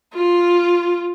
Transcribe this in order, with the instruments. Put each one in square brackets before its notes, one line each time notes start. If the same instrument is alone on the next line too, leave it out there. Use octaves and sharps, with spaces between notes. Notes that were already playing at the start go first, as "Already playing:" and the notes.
[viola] F4